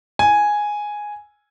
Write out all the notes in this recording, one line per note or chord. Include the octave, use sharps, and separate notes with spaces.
G#5